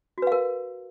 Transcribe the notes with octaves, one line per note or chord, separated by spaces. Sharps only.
F#4 A#4 B4 F5